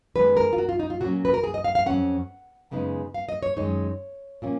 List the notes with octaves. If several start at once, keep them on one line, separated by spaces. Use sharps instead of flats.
F#2 D#3 G#3 B3 B4
A#4
F4
F#4
F4
D#4
F4
A#2 F#3 A#3 C#4 F#4
B4
A#4
G#4
D#5
F5
F5
F2 C#3 F#3 C#4 F#5
F#2 C#3 G#3 B3 D#4
F5
D#5
C#5
F#2 D#3 G#3 D#4 C#5
A#2 F3 A#3 C#4